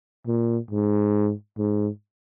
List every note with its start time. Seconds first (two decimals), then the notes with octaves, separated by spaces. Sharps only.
0.27 A#2
0.71 G#2
1.58 G#2